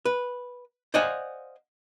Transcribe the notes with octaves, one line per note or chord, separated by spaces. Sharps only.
B4
C5 D5 D#5 F5 F#5 G#5